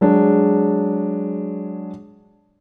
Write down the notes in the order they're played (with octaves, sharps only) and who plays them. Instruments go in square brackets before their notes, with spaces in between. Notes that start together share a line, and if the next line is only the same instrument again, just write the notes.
[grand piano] F#3 G#3 D4 G#4